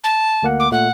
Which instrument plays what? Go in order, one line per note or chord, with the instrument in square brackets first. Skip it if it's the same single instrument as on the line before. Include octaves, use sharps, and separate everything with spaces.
[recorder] A5
[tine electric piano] D2 A#3 F#5
[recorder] D6
[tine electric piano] A#2 A3 [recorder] F#5